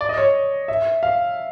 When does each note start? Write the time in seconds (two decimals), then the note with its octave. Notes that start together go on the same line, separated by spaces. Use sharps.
0.01 D5
0.09 D#5
0.18 C#5
0.68 E5
1.03 F5